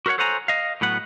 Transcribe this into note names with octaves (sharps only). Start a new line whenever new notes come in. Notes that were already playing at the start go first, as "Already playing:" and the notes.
F#4 A#4 B4 C#5 F#5
A4 C5 C#5 F#5 G#5 A#5
D#5 F5
A2 F#3 B3 F#5